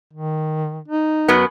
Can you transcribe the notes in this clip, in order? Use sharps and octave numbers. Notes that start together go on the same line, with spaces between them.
D#3
D#4
F#2 F#3 B3